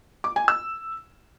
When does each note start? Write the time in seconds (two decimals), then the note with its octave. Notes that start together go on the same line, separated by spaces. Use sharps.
0.24 D6
0.36 G#5
0.48 E6